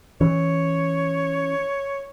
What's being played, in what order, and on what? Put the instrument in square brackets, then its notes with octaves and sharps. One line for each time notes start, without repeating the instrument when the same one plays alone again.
[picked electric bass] E3 C#4 [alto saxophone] C#5